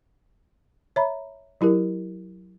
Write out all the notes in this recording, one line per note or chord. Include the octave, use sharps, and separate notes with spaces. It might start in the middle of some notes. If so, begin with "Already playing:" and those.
C#5 E5 A#5 B5
F#3 E4 G4 A#4